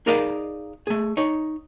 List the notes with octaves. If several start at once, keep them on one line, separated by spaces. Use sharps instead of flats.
D#4 G#4 A#4 D5 D#5 F5
A3 G#4
D#4 C#5